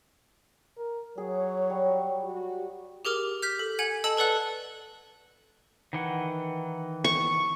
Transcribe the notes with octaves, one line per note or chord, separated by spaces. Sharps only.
A#4
F#3 G#4 C#5
G3
F#4 G4
G4 G#4 A#4 D6 F6
F6 G6 B6
A4
F#5 G#5 G#6 F#7
A4 D#5 A5 E6 F#7
A4 B4 D5 F#5 F#6
D#3 E3 F#5
C#6